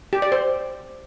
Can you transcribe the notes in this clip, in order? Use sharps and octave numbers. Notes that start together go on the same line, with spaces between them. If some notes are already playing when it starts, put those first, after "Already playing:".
G4
D5
C5